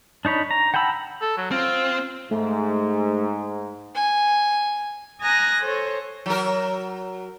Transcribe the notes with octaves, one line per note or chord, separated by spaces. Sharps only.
D4 D#4 C#5 B5
A#5
F#5 G5 A5 B5 E6
A4
F#3
C4 F4
G#2 A3
G#5
G#5 A#5 D#6 F#6 A#6
A4 C5 C#5
F#3 A#4